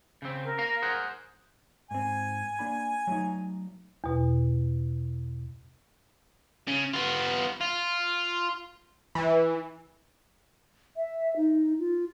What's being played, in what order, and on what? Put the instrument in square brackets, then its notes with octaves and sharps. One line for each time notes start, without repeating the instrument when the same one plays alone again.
[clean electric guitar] C#3 C4
[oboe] A#4
[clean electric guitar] F5 A#5
G#4 C5 F#5
[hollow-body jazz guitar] G#2 C4 [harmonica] G#5
[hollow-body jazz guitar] A#3 D4 B5
F#3 A3 D#4
[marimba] E2 B2
[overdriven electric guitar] C#3
B3 F4
F4
[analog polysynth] E3
[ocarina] E5
D#4
F4